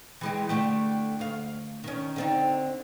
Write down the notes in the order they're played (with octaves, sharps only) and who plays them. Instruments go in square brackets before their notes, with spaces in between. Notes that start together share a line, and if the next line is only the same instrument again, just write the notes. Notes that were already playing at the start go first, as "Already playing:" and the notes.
[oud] E3 G#3 G4
D3 A3 G4
D2 F5
D#3 C#4
D3 C4 D#4